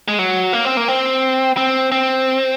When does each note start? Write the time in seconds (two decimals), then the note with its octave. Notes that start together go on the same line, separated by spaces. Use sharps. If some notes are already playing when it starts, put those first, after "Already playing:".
0.08 G#3
0.19 F#3
0.53 A#3
0.65 C4
0.77 A#3
0.88 C4
1.57 C4
1.92 C4